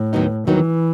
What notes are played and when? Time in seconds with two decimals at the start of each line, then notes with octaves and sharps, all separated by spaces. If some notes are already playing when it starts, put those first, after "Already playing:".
Already playing: A2
0.13 D#2 D#3 F#3 B3 D#4
0.47 D#2 D#3 E3 F#3 B3 D#4